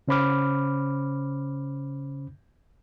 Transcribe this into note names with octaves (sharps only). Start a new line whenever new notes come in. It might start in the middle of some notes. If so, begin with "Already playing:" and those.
C#3 C#4 C5 B5 D6 F6